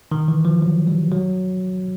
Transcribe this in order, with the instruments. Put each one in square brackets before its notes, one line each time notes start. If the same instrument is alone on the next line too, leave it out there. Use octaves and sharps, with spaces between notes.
[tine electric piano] D#3
E3
F3
F#3
G3
F#3